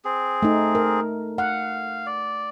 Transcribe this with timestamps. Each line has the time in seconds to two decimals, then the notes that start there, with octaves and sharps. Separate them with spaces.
0.05 C4 G#4
0.42 A3 D#4
0.75 A#4
1.38 F5 F#5
2.07 D5